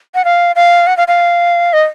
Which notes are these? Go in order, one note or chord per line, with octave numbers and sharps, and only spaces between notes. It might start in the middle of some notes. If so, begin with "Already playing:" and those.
F#5
F5
F5
F#5
F5
F5
D#5